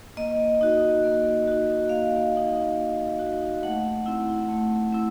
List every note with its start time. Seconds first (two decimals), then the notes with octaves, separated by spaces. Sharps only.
0.17 A#3 D#5
0.61 D#4 F#4
1.04 A#3
1.47 D#4 F#4
1.89 A#3 F5
2.33 D#4 F#4
2.77 A#3
3.19 D#4 F#4
3.63 A3 F#5
4.06 C4 E4
4.48 A3
4.92 C4 E4